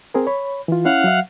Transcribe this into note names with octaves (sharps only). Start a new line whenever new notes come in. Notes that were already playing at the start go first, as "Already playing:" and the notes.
C4 G#4 A#4
C#5 B5
E3 F4
C#4 E4 F5 F#5
F#3 E5